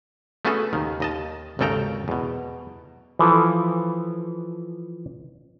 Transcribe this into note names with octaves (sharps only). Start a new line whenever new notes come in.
A3 B3 C#4 F#4 G#4 A4
D#2 D#3
D#2 D#5 A5
G#1 D#2 C#3 A4 G5 A#5
E2 B2
E3 F3 A4